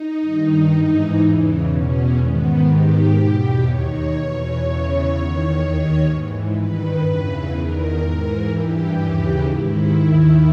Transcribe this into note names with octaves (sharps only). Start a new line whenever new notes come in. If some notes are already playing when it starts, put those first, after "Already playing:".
Already playing: D#4
G2 D#3
G#2 E3
E2 C#3 E3
E2 B2 C#4
G#2 D#3 B3
G#2 D#3 G4
E2 B2
D#2 D#3 C#5
E2 B2
E2 C#3 E3 C#5
E2 D#3
D#2 D#3
G#2 E3
G2 D#3 B4
E2 C#3 E3
E2 D#3 A#4
G#2 E3
G2 E3 G4
D#2 C#3 E3
G#2 D#3 E4
D#2 D#3